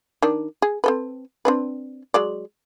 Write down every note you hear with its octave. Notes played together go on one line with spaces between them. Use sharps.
D#3 D4
G#4
C4 A4 B4
C4 D4 B4
F#3 G#3 D5